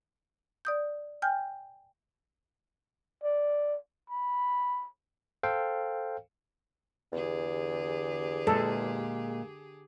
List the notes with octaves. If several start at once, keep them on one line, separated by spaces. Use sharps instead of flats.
D5 D#6 G6
G5 G#5 F6 G6
D5
B5
A4 C5 F5 G5
E2 D3 G4 G#4
A#2 G#3 A4